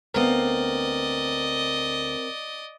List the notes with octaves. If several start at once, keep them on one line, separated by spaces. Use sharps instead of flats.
D2 B3 C4 A#4 D5 D#5 F5